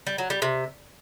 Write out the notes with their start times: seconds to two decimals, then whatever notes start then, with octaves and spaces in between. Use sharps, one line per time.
0.07 G3
0.18 F#3
0.30 G3
0.42 C3